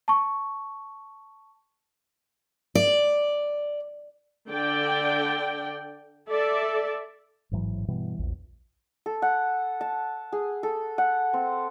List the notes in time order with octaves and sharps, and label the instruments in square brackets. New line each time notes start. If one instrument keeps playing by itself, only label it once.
[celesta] A5 C#6
[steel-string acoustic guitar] D5
[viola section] D3 D5 G5
A4 D5 E5
[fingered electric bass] A1 G#2 E3 F#3
G2 B2 E3 G3
A#1 E2
[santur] A4
F#5
A5
G#4
A4
F#5
C4